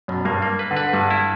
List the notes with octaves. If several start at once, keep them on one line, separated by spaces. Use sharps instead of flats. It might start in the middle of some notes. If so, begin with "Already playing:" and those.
F#2 B2
G2 A#3
A#3
B4
D3
B4
G2 D3
E4